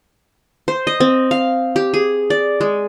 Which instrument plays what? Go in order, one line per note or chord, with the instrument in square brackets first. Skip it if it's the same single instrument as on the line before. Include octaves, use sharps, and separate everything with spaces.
[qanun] C5
D#5
C4
F5
G4
G#4
D5
G#3